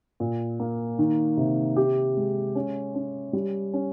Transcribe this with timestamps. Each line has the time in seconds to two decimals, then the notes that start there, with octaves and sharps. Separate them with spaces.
0.20 A#2
0.60 A#3
0.99 D#3
1.37 C3
1.76 G4
2.17 G#3
2.55 C#4
2.95 C#4
3.33 G3
3.74 C#4